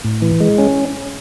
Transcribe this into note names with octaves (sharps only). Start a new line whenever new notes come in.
A2
E3
G#3
C#4